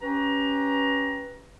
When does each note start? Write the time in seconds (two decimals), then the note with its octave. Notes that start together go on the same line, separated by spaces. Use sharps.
0.02 C#4 G4 B4 A#5